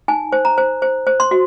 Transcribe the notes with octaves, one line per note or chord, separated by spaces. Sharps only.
D#4 G#5
C5
A#5
C5
C5
C5
C6
F#4